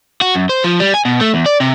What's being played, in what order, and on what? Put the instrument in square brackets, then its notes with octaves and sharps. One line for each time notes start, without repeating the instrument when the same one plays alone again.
[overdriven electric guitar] F#4
F#2
C5
F3
G3
G#5
B2
A3
E2
D5
C3